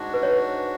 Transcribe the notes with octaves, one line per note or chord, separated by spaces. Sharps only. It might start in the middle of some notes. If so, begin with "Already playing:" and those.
Already playing: G#2 G#3 D4 F#4
B4
C#5